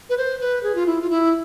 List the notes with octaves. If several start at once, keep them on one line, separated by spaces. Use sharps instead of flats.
B4
C5
B4
G#4
F4
E4
F4
E4